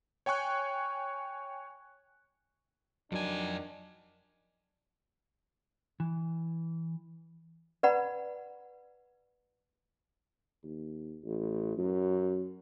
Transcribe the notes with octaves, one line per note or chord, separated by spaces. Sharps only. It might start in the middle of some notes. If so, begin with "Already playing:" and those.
C#5 G5 G#5 C#6 F#6
F2 D#3 F#3 D4 G#5
E3
B4 D5 F#5 A#5 B5
D#2
A1
F#2